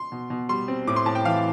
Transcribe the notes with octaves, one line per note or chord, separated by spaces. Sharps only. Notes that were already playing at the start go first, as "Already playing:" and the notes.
Already playing: C6
B2
B2
G3 C6
C4
A2 D6
C6
A2 A5
G5
E3 F5